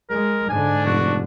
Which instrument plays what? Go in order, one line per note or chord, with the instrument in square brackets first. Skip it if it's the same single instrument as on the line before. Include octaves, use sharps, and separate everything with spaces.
[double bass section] G#3 [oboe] A#4
[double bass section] G#2 D3 [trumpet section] D4 [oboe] G#5
[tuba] F1 [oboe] F#4